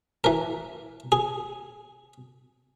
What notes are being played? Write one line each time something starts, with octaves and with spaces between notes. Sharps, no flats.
E3 A#4
G#4